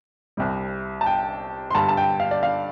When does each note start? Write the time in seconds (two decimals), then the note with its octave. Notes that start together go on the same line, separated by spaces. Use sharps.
0.37 C2 C3 G3
1.01 A5
1.06 G5
1.71 C6
1.74 G2 D3 G3 A5
1.89 A5
1.97 G5
2.20 F5
2.31 D5
2.43 F5